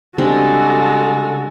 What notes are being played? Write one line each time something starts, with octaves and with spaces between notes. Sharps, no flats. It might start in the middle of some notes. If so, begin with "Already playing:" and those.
C#3 G3 G#3 C4 D4 F#4 A4